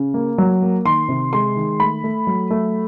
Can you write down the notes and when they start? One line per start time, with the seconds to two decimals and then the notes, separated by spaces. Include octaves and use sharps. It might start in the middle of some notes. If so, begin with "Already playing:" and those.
Already playing: C#3
0.14 A#3
0.38 F#3
0.62 A#3
0.85 D#3 C6
1.08 C3
1.33 G#3 C6
1.56 D#3
1.80 A3 B5
2.04 A3
2.27 F#3
2.50 A3